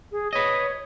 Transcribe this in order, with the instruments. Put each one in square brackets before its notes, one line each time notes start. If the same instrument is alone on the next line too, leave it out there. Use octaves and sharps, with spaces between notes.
[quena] G#4
[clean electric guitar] B4 D#5 [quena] C#5